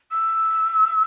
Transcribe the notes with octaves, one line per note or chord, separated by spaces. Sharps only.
E6